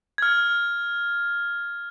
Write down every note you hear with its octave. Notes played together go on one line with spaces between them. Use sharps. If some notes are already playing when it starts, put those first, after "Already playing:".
F6 G#6